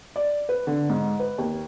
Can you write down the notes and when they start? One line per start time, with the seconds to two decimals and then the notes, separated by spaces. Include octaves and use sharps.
0.16 D5
0.49 B4
0.67 D3
0.89 G#2
1.20 B4
1.38 D#2